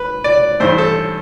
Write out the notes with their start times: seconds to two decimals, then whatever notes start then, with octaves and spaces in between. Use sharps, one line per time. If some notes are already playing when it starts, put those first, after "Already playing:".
Already playing: B4
0.24 D5
0.60 G2 E3 A3 C5
0.78 A4